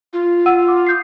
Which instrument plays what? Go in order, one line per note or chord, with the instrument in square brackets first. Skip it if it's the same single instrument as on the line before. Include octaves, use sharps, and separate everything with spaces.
[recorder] F4
[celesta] F#5 E6 D#7
D6
D#6 G6 C7